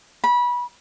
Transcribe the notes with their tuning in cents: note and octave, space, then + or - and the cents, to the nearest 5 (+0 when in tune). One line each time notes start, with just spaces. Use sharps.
B5 -25